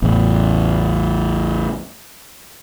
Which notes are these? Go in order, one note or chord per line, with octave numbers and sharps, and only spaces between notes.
A1 E2